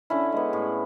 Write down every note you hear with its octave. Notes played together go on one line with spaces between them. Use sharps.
D3 C#4 E4
G#3 B3
A2